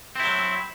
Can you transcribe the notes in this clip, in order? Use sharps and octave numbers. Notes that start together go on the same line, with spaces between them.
F#3 C4 E4